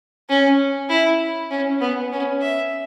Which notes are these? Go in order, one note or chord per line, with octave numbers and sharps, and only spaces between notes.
C#4
E4
C#4
B3
C#4
E5